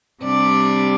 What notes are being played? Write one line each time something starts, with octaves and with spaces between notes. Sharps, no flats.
C3 G3 D4 D5